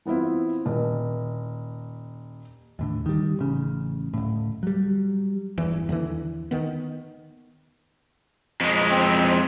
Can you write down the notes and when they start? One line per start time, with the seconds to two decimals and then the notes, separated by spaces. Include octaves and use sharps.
0.05 E3 B3 C4 E4 F4
0.66 D#1
2.79 D#2 A2 D3
3.06 D#3 G3
3.39 A1 C#3
4.14 D1 A2
4.63 F#3 G3
5.58 D1 G1 E2 E3
5.89 D#2 D3 E3
6.51 D#3 B3
8.61 F2 G#3
8.91 C4